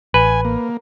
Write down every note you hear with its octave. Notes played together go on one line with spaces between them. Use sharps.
A1 B4 G#5
A#3